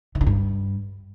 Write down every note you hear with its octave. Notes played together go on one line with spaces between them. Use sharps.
D#3
D3
G2